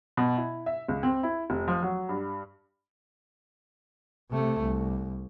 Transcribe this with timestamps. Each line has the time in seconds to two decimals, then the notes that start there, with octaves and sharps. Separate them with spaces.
0.17 B2
0.37 E4
0.66 E5
0.88 C#2
1.03 C4
1.23 E4
1.50 F1
1.68 F3
1.82 F#3
2.09 G2
4.31 C3 A3
4.61 C2